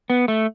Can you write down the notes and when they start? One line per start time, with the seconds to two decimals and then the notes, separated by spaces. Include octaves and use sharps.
0.10 B3
0.28 A3